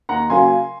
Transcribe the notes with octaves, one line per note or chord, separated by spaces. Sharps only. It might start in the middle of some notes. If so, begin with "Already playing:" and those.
D#2 F#5 A#5
C#3 F#3 A#3 G#5 C6